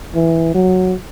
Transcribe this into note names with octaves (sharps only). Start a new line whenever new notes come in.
E3
F#3